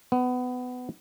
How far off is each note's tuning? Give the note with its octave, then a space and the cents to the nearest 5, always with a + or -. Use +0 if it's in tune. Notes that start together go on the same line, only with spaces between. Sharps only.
B3 +20